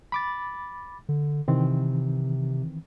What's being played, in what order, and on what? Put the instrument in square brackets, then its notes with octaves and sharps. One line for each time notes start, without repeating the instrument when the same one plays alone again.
[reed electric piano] B5 D6 A6
[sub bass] D3
[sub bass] C3 [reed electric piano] D#3 E3 C4